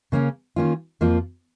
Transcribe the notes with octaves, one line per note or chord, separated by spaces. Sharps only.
C#3 A#3 C#4
D#3 A#3 C#4 F4
F2 F3 A#3 F4